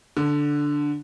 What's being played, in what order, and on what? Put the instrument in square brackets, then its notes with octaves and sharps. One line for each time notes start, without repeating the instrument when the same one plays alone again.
[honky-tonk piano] D3